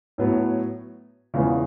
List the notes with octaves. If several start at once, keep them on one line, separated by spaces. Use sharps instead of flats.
A2 F#3 B3
E2 C#3 F3 G#3 B3